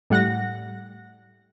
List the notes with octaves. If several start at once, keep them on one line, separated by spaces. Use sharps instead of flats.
A2 G3 F#5 F#6 A#6